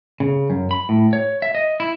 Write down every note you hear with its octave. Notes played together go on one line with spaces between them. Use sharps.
C#3
F#2
B5
A2
C#5
E5
D#5
E4